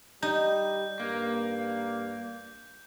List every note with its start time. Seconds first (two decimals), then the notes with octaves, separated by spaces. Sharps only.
0.23 G3 D#4 G6
1.00 G2 A#3